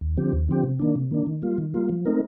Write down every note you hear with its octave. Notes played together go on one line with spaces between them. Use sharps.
D#2
D3 F3 C4 G4
D#2
D3 F3 C4 G4
C3
D#3 A#3 D4
C3
D#3 A#3 D4
D#3
G3 A#3 F4
D#3
G3 A#3 F4
F3
A3 C4 D#4 A#4